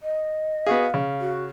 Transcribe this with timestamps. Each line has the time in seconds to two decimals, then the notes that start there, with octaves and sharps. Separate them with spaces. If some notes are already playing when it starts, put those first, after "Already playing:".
0.02 D#5
0.67 B3 F#4 G#4 F5
0.94 C#3
1.20 F#4